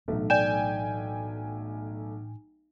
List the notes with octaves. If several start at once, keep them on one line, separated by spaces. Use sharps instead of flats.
B1 A2 E3 A3 D4
D5 G5 G#5 G6 E7